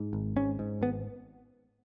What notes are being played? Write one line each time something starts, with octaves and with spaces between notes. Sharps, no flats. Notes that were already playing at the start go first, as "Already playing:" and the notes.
Already playing: G#2
G#1
G#2 C#4
G#2
G#1 B3